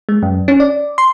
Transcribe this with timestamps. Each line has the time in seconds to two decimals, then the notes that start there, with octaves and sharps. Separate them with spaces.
0.09 G#3
0.23 F#2
0.48 C#4
0.60 D5
0.98 C6